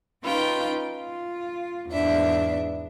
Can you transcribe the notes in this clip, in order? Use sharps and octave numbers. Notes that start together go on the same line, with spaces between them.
C#4 D#4 F4 B4 G5
F4
E2 G#2 B3 D4 E5